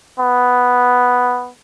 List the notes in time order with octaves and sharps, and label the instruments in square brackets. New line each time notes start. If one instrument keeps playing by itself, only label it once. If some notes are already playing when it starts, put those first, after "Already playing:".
[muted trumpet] B3